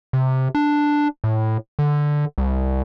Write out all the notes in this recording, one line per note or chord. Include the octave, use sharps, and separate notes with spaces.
C3
D4
A2
D3
C2